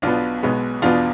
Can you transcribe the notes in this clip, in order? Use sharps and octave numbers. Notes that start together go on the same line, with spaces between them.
B1 B2 B3 D4 F4
B1 B2 G#3 B3
E2 B2 B3 D4 F4